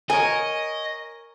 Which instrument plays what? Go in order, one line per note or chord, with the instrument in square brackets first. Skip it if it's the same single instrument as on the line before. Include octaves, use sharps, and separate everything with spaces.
[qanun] A#4 C#5 [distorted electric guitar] D#5 [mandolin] G#5